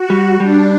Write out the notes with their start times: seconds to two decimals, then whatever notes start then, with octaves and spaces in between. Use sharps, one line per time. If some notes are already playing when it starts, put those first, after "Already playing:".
Already playing: F#4
0.10 G3
0.40 G3 D4